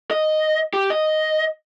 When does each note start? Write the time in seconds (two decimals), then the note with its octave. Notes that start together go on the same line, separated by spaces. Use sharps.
0.11 D#5
0.73 G4
0.90 D#5